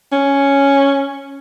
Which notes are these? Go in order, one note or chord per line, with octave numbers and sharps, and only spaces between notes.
C#4